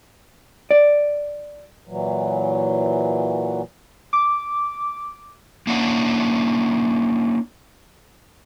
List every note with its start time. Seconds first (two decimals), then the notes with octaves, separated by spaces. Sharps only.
0.71 D5
1.87 A#2 E3 F#3
4.13 D6
5.67 A#3 C#4 D4 E4 F#5